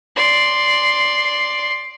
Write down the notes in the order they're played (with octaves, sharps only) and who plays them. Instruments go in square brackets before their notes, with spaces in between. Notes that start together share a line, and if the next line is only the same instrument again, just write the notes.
[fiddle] D5 C6